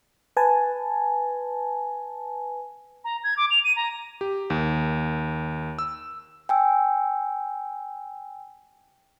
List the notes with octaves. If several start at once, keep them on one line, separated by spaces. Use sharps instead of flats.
B4 G#5 A5
A#5
G#6
D6
F7
D#7
A#5
G4
D#2
E6
G5 G#5 E6